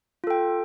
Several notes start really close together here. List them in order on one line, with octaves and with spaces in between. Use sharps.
F4 A4 G5